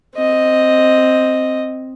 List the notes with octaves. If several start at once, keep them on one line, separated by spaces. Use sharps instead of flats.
C4 D#5